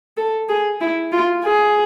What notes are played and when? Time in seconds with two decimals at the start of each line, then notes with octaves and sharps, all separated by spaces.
0.17 A4
0.49 G#4
0.81 E4
1.12 F4
1.44 G#4